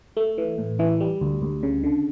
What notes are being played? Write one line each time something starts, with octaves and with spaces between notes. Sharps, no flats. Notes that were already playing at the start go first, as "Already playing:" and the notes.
A3
E3
A2
E3
G3
D2
D2
C#3
D3